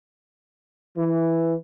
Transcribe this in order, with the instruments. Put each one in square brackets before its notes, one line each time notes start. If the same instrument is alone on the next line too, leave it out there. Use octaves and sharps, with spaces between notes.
[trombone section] E3